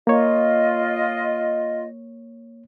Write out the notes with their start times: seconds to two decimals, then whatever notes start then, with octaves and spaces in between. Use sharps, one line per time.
0.07 A#3 F4 C#5 D#5